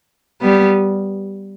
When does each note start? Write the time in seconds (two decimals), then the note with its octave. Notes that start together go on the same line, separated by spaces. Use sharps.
0.41 G3 B3